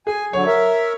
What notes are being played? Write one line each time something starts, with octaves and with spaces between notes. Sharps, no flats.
G#4 G#5
D3 F#3 C#5
A#4 E5